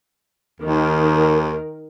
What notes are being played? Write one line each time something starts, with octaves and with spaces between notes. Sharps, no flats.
D#2 D#3 A#4